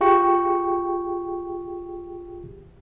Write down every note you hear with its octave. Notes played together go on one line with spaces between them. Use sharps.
F4 G4 G#4 G5 C#6